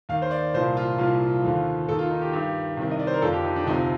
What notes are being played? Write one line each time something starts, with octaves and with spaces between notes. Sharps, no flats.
D#2 D#3 F5
C5
D5
C2 A#2 F3 C5
F4
C2 A#2 F3 F4
D#2 D3 F3
D#2 D#3 A4
F4
D#4
G4
G2 D#3 G4
C2 C3 D#3
D#5
D5
C5
A#4
F2 D3 F3 A4
G4
D#4
D4
D2 C3 F3 D#4